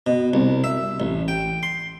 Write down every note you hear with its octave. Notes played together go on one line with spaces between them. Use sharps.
B2
C2
E5
A1
G5
C6